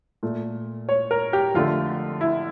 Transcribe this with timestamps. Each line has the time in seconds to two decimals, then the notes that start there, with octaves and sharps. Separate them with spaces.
0.23 A#2 A3
0.89 C#5
1.11 A#4
1.33 G4
1.54 F2 D3 A3 F4
2.21 E4